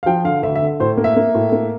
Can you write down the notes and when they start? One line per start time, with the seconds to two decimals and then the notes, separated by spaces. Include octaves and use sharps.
0.03 F5
0.06 F3 G5
0.24 D3 F5
0.43 D2 E5
0.56 E5
0.62 D3
0.80 A2 C5
0.97 A#3
1.04 E5
1.16 A#3
1.34 A2
1.52 A#3